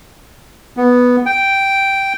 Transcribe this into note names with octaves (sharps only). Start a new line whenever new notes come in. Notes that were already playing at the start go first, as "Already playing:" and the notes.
B3
G5